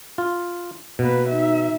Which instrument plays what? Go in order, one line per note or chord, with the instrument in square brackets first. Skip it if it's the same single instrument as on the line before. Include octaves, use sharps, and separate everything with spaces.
[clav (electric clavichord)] F4
[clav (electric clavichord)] B2 [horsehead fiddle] A#3 B4
[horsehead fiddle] D#4 E5